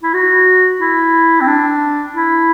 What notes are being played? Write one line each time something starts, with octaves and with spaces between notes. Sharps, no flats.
E4
F#4
E4
C4
D4
E4